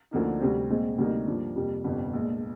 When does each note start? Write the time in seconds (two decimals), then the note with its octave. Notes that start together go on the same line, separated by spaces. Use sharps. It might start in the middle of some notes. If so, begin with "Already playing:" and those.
0.11 D2 D3 F3 A#3 D#4
0.40 D2 C3 G3 C4
0.70 A#1 A#2 G#3 C4
0.98 D2 C3 G3 A#3 D#4
1.27 G2 F3 A#3 D4
1.56 F2 C3 G3 A#3
1.84 G1 F2 C3 G3
2.13 A#1 A#2 G#3